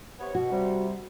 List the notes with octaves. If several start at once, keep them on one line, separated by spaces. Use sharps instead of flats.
C3 B3 C#5
B2 F#4
C3 G3